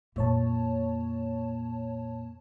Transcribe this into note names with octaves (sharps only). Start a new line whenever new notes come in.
F2 A#2 C#5 A5